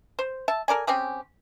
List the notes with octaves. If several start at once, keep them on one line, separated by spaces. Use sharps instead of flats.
C5
E5 A5
A4 A#4 D5 G#5
C4 C#4 G4 G#4